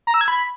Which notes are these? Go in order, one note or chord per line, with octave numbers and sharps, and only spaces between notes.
A#5
E6
G#6
B5